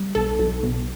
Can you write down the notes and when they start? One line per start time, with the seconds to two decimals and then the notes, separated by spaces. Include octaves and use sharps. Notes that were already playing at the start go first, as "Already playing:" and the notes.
Already playing: G3
0.15 B1 A4
0.39 B1
0.63 B1